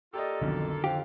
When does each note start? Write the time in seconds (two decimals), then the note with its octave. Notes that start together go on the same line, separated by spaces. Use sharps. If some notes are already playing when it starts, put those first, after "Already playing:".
0.13 A#3 F4 G4 A4 D5 D#5
0.42 B1 F2 D3 D#3
0.84 F2 G4 F5